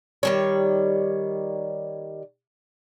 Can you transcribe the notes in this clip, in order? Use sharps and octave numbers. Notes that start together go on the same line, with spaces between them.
D#3 G3 C#5